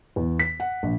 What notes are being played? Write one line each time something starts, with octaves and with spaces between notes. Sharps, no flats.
E2
B6
F#5
A#1